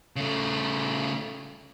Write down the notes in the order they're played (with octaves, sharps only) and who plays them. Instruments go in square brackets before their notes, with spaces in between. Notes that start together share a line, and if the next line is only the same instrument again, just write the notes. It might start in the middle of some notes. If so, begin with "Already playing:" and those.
[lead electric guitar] C#3 A3